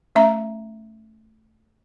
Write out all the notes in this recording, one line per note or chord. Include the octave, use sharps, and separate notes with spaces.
A3 C#4 E5 A#5